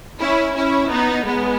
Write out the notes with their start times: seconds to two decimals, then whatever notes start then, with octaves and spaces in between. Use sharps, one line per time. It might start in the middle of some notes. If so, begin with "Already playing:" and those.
0.20 C#4 E4
0.55 C#4 E4
0.91 B3 D#4
1.26 G#3 B3